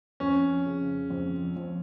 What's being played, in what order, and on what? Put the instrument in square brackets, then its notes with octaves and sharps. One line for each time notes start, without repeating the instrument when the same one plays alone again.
[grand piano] F2 [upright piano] C#4
[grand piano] C#3
F2
F2